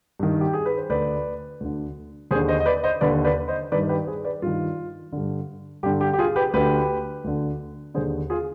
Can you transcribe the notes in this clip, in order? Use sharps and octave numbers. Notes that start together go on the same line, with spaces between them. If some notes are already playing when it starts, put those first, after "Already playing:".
G2 D#3
G4
G#4
B4
C5
D2 D3 B4 D5
D2 D3
D#2 D3 G#4 C5
C5 D#5
D#5
B4 D5
C5 D#5
D#2 D3 B4 D5
B4 D5
C5 D#5
G2 D#3 B4 D5
G4 B4
G#4 C5
B4 D5
G2 D#3 F4
G2 D3
G2 D3 G4
G4
G4
F4 G#4
G4 B4
D2 D3 G4 B4
D2 D3
D#2 D3 G#4 C5
F4 G#4